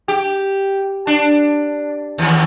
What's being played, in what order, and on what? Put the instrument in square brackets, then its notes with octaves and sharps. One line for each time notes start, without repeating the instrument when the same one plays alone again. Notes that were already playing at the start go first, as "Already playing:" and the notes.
[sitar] G4
D4
D#2